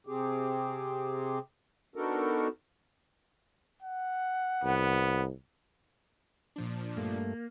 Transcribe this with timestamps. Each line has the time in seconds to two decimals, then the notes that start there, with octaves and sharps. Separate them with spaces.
0.07 C3 C4 G4 G#4
1.96 B3 D4 D#4 F#4 A4 A#4
3.82 F#5
4.64 C2 B3
6.56 A#2 F3 D4
6.97 G2 A3 A#3